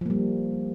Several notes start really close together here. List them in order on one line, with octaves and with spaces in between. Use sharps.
F3 A#3 G3